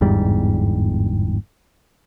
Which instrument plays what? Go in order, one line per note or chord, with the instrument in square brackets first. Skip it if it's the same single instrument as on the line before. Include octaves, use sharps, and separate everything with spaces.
[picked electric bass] G1 E2 G#2 G3